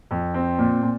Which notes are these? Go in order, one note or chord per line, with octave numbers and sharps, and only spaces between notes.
F2
C4
A#2
A#2